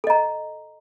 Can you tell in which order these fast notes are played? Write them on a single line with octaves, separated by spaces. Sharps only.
A4 D#5 A#5